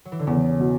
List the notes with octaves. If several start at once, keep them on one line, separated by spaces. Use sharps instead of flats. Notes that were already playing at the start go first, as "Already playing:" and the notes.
F#3
E3
D3
E2 C#3
B2